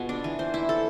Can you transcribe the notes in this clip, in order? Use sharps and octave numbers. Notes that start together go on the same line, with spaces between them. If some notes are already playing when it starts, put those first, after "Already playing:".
Already playing: B2 B3 F4 G#4
D4
E3
C5
E4
A4